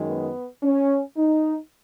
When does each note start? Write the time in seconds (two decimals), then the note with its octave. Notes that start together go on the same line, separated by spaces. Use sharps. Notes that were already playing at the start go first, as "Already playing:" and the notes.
Already playing: F#2 D#3 G#3
0.09 B3
0.63 C#4
1.17 D#4